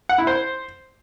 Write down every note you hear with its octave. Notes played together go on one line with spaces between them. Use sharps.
F#5
E4
C5